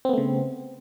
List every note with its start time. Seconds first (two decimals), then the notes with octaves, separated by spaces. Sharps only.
0.05 C4
0.09 B3
0.13 A3
0.18 C#3